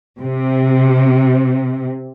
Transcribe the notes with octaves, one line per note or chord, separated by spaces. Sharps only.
C3